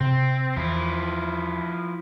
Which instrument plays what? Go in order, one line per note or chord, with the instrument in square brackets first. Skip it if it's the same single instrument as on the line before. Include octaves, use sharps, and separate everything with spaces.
[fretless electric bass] C3 [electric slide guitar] C4
[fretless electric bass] E2 [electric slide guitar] F3 E4